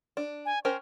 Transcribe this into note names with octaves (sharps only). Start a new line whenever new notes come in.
D4
G#5
C#4 A#4 C5 G5